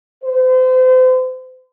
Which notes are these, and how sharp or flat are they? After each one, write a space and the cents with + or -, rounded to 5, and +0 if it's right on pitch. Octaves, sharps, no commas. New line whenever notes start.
C5 -35